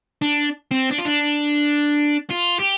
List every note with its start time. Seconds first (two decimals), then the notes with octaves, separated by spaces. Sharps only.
0.22 D4
0.71 C4
0.91 D4
0.98 F4
1.05 D4
2.30 F4
2.59 G4